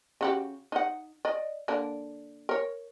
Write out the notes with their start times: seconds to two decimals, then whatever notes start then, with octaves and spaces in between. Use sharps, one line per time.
0.21 C#3 F#4 G4
0.72 D#4 F#5
1.25 D5 D#5
1.68 D3 A#3 D4
2.49 A#4 C#5